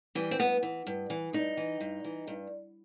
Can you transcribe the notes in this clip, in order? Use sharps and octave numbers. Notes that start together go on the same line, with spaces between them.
E3 G3
C4
G2 B3
E3
G2
E3
G2 D#4
E3
G2
E3
G2